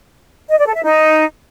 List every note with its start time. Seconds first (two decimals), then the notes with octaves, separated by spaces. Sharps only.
0.50 D#5
0.58 D5
0.66 A4
0.75 E5
0.83 D#4